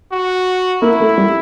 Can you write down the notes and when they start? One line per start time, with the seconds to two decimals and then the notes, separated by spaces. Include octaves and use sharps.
0.12 F#4
0.82 A#3 E4
1.00 A3
1.18 G3